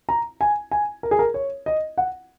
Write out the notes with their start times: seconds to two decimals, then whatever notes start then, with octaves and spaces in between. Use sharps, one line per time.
0.09 A#5
0.41 G#5
0.71 G#5
1.03 A#4
1.11 G#4
1.19 A#4
1.34 C#5
1.66 D#5
1.98 F#5